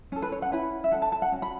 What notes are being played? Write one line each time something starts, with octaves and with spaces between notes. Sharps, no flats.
C#4 A4
B4
C#5
F#5
C#4 E4 B4 B5
E5
C#4 F#4 A4 F#5
A5
A5
F#5
C#4 F#4
B5